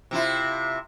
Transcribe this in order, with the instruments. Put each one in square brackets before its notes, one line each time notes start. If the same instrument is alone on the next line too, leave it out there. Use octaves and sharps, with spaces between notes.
[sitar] C3 E4 F4